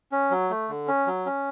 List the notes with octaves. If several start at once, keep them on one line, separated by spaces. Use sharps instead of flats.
C#4
F#3
A3
D3
C#4
F#3
C#4